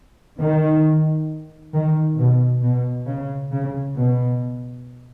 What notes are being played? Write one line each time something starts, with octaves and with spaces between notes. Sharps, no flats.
D#3
D#3
B2
B2
C#3
C#3
B2